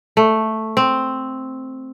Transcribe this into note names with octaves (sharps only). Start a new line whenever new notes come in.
A3
C4